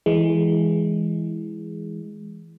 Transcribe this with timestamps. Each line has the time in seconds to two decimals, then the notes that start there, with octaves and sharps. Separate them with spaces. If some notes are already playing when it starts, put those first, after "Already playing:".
0.06 E3 G#3